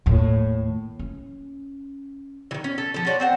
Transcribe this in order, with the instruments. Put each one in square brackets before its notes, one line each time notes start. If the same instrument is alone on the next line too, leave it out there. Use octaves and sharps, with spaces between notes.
[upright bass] D#2 A2
C#4
[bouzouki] D#3 E3
C#4
A4
F3 A4
F4 F#4 C#5 D5
C4 C5 F#5